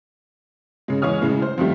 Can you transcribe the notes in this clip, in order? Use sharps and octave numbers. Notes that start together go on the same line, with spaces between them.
C#3 G#3
E2 G#3 C#5 D#6 F6
A2 C#3 G#3
C5
F2 D#3 F3 G3 A3